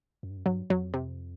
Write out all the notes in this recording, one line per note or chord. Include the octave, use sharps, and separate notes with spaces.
F#2
G2
F#2
G2 F#3
F2 F#3
C3